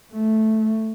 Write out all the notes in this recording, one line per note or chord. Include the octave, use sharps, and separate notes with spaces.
A3